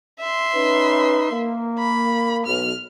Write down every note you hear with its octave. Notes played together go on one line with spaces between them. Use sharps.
E5 C6
C#4 D#4 B4
A#3
B5
B1 F6